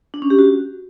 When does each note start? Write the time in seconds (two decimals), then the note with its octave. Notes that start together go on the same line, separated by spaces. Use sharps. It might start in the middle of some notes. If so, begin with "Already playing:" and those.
0.14 D4
0.22 C#4
0.30 G4
0.39 F#4